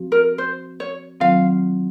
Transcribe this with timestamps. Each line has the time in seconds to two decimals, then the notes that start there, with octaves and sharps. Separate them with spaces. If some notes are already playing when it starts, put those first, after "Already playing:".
Already playing: F3 C4 F#4
0.12 A#4
0.38 C5
0.80 C#5
1.20 D#3 F#3 C4 F4 F5